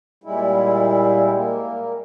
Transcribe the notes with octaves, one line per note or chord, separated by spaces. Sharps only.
A#2 G3 G#3 E4
A#3